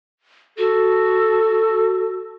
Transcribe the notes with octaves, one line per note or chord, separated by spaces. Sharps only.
F#4 A4